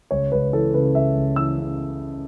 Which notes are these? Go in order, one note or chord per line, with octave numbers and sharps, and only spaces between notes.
C#2 C#5
C#2 B4
E3 A4
C#3 B4
C#2 E5
C#2
E3 E6
C#3